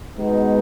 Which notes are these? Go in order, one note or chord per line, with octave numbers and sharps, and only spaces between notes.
B2 G#3 B3 D#4